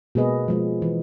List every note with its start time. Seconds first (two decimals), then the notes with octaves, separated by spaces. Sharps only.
0.15 B2 G#3 A#3 G#4 B4 D#5
0.48 F3 G#3
0.82 E3